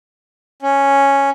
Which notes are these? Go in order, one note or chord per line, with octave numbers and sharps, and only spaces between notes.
C#4